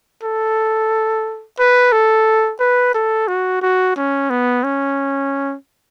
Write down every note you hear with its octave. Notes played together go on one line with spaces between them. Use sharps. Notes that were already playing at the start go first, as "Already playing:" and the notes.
A4
B4
A4
B4
A4
F#4
F#4
C#4
B3
C#4